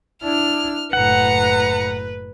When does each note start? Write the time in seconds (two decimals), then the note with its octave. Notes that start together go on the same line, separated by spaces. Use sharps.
0.23 D4 E4 F6
0.93 F#1 A2 B4 F#5 A#5 C#7